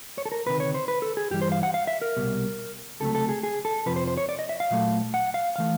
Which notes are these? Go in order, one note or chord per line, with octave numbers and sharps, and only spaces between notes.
C#5
A4
A#4
D2 C3 D#3 B4
C#5
C5
B4
A4
G#4
G2 E3 G3 G4
C5
F5
F#5
F5
E5
A#4
C2 B2 G3
C#2 C3 D#3 F#3 A3 A4
A4
G#4
G#4
A4
F2 C3 F3 B4
C5
C5
C#5
D5
D#5
E5
F5
A#2 F#3 A3
F#5
F5
E3 A3 F5